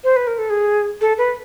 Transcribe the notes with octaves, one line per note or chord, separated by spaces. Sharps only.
C5
B4
A#4
A4
G#4
A4
B4